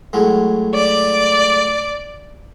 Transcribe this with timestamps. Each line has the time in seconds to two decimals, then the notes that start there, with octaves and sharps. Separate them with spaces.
0.13 A2 F#3 G#3
0.74 D5